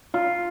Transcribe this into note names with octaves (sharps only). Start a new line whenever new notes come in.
F4